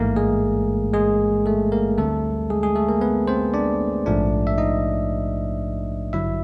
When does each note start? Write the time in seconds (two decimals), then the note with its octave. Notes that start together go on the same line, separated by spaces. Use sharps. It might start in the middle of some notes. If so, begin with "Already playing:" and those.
Already playing: A1 G#2 E3 A3 A#3 A#4
0.16 G#3 G#4
0.94 G#3 G#4
1.46 A3 A4
1.72 A#3 A#4
1.98 D2 D3 G3 A3 C4 A4
2.50 G#3 G#4
2.63 G#3 G#4
2.75 A3 A4
2.89 A#3 A#4
3.01 B3 B4
3.28 C4 C5
3.54 D4 D5
4.06 A#1 G#2 F3 A3 D4
4.47 E5
4.58 D#4 D#5
6.13 A1 G2 D3 F#3 E4 E5